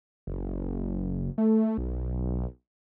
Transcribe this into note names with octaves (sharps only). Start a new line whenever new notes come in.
F#1
A3
B1